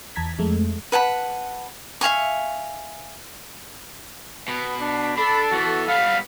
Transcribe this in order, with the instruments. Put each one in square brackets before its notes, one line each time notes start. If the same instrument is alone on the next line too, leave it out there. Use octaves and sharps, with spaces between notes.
[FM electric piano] E2 A5 A#5 G#6 B6
F2 G#3 A3
[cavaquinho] B4 F#5 A5 B5
E5 F5 G#5 C#6
[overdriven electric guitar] B2 [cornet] B3
[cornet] D4
[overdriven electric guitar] D4 [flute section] A4 [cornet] B5
[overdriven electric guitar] E2 E3 [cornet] F#4
[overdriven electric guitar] G3 B3 [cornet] F5